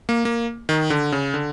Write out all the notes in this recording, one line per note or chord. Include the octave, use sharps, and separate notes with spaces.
A#3
A#3
D#3
D3
C#3
D3